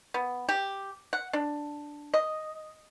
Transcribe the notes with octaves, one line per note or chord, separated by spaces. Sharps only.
B3
G4
F#5
D4
D#5